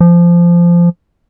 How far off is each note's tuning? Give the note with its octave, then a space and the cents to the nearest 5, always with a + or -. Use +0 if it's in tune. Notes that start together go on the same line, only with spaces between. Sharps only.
F3 -15